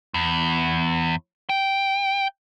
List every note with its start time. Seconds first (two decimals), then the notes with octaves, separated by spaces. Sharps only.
0.14 E2
1.49 G5